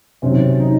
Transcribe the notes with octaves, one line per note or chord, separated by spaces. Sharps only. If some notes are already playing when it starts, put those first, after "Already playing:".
C3 D#3 F#3 C4 C#4
D#4